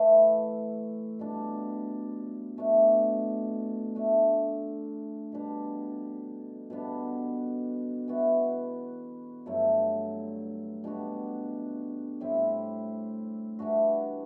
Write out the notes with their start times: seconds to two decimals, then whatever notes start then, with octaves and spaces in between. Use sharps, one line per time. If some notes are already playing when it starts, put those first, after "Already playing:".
Already playing: E3 A3 E4
1.19 B2 G3 D4
2.57 B2 A3 D4
3.95 D3 A3 D4
5.32 B2 G3 D4
6.70 B2 G3 B3 D4
8.08 E3 B3 F#4
9.46 G2 D3 F#3 A3
10.84 B2 G3 D4 F#4
12.21 A2 G3 C4 E4
13.59 E3 G3 D4 F#4